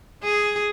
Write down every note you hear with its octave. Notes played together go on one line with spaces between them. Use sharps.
G#4